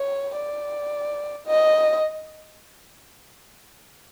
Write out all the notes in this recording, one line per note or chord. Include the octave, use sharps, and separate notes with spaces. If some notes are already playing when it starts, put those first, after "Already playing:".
Already playing: C#5
D5
D#5